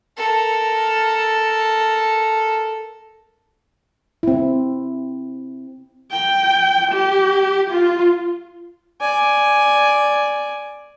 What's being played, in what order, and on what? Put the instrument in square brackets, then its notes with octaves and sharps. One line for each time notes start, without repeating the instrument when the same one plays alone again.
[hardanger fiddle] A4 A#4
[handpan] C4 E4
[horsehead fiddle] G5
G4
F4
[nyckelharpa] D5 G#5